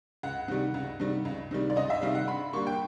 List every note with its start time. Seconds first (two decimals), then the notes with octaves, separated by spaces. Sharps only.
0.23 C#2 F#5
0.48 C3 D#3 G3
0.74 C#2
1.00 C3 D#3 G3
1.25 C#2
1.51 C3 D#3 G3
1.70 D5
1.76 C#2 D#5
1.90 E5
2.02 C3 D#3 G3 F5
2.15 F#5
2.28 G2 B5
2.53 D3 G3 A#3 C#6
2.67 G5